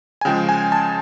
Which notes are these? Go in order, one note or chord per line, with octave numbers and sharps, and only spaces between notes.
G#5
C#3 F3 G#3 G5
G#5
A5